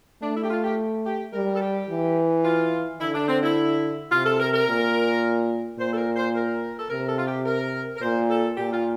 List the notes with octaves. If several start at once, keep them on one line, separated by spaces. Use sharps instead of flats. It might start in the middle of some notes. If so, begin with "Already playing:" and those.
A3 D4
E4
G4
F4
G4
G4
G3 A#4
A4
G4
E3
F4
D3 E4
D4
C4
E4
C3 F4
A4
A#4
A#4
A#2
A#2 C5
A4
A#4
C5
A#4
A4
C3 A#4
A4
F4
G4
A#4
A#4
A#2 C5
A4
A#2 G4
F4